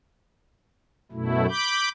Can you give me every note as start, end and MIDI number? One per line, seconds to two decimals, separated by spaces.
1.12 1.46 42
1.12 1.46 47
1.12 1.46 57
1.12 1.46 64
1.49 1.89 83
1.49 1.89 86
1.49 1.89 91